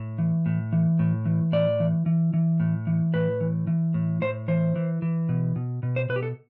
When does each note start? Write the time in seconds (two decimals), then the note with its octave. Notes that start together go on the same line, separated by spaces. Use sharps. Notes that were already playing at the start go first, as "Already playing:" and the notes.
Already playing: A2
0.18 E3
0.46 A2
0.72 E3
0.99 A2
1.25 E3
1.52 A2 D5
1.80 E3
2.06 E3
2.34 E3
2.60 A2
2.87 E3
3.14 A2 B4
3.41 E3
3.67 E3
3.94 A2
4.21 A2 C5
4.48 E3 C5
4.76 E3
5.02 E3
5.29 B2
5.56 B2
5.83 B2
5.96 C5
6.09 B2 B4
6.16 G4
6.23 A4